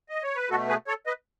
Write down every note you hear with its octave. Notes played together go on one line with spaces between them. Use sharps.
D#5
C#5
B4
B2 A3 F#4 A4
G#4 B4
A4 C#5
B4 D#5